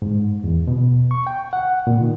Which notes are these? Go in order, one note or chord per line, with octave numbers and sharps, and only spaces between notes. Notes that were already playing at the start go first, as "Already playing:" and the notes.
G#2
E2
B2
C#6
G5
F#5
A#2
D#3